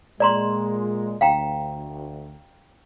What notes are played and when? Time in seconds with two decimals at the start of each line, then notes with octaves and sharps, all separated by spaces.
0.20 A#2 G#3 D5 A#5 C6
1.21 D2 F5 G5 A#5